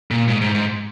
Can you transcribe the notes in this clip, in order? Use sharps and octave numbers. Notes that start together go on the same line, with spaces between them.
A#2
G#2
G#2
G#2